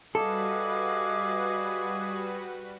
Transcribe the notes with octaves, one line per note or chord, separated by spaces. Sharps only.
G3 F#4 G#4 A4 B4 D#5 F5 D6